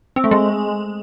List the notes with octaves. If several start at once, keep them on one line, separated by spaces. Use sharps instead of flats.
C4
A3
G#3